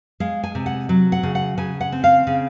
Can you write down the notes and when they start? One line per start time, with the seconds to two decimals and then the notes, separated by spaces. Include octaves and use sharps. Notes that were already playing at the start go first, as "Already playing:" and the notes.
0.20 G#3 F5
0.43 G#5
0.55 C3
0.66 F#5
0.89 F#3
1.12 F#5
1.23 C#3
1.35 F#5
1.58 C#3 G#5
1.81 F#5
1.92 C4
2.04 F5
2.27 C#3